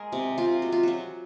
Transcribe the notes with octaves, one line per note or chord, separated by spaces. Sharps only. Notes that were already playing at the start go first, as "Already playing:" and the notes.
Already playing: G#3 G#4 A#4
C3
C3 F4
G#3 F#4
F4
F#3 F#4